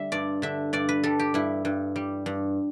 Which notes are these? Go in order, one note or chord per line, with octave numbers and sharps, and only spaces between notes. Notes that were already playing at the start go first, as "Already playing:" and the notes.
Already playing: D3 G3 E5
G2 D5
D3 E5
G2 D5
B4
G3 A4
G4
G2 E4
G2
G3
G2